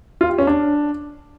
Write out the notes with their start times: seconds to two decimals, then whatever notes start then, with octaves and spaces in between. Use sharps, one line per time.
0.21 F4
0.30 G4
0.38 C#4
0.47 D4